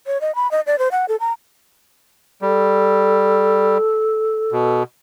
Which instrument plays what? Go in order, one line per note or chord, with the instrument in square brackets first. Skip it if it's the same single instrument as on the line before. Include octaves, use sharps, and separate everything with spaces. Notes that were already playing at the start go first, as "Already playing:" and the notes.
[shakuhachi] C#5
D#5
B5
D#5
D5
C5
F#5
A4
A#5
[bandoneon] G3 [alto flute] A4
[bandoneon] B2